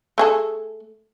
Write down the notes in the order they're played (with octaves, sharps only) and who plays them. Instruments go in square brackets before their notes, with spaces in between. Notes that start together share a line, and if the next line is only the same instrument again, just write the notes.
[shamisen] A3 G#4 A4